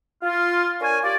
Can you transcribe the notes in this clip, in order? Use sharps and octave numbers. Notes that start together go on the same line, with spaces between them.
F4
D4 A#4 C#5 G#5
F4 G4 D5